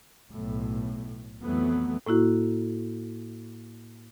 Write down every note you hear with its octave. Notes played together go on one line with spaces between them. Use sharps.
B1 A2
F2 E3 F#3 A3 B3
A2 A#3 E4 F#4